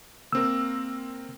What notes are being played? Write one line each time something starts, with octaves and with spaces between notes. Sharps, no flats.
A#3 C4 A#4 E6